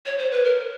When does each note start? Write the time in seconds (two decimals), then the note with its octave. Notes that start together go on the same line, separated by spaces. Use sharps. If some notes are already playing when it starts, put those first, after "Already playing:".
0.06 C#5
0.18 C5
0.31 B4
0.44 A#4